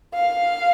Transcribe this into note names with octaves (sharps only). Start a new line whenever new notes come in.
F5